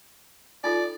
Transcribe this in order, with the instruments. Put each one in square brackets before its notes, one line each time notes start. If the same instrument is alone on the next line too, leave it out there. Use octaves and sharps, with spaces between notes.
[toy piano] D#4 F4 A4 [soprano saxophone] D5